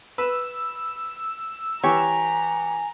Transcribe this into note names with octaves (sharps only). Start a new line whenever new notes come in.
B4 E6
E3 G4 C#5 G#5 A#5